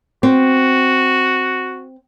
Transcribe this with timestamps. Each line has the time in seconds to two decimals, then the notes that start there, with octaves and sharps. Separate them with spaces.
0.23 C4 F#4